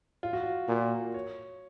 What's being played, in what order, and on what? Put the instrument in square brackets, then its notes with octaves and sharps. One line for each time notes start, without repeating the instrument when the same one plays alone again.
[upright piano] F4
F#4
F4
[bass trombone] A#2
[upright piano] C#5